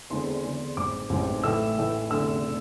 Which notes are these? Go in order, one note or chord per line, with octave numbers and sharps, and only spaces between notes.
E2 D3 G#3 C4 C6
E2 D3 G#3 C4
A1 G#2 G#3 C4 D6
A1 G#2 G#3 C4
A2 E3 A3 E6
A2 E3 A3
F1 E2 D3 A3 E6
D3 A3